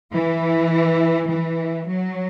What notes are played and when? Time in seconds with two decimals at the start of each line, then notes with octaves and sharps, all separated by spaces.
0.13 E3
1.30 E3
1.88 F#3